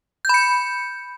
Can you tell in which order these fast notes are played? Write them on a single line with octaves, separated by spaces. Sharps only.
G6 B5 C#7